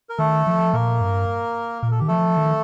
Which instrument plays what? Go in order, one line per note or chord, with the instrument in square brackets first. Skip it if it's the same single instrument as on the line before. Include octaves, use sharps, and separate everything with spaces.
[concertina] A#4
[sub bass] D#3 [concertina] A3 A4
[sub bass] F3
[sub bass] A#2 [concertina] A#3 A#4
[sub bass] G2
[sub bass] A#2 [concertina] A#4
[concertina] A4
[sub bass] D#3 [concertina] G4
[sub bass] F3 [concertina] A3 A4
[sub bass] D#3